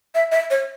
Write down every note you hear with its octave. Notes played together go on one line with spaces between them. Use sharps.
E5
E5
C#5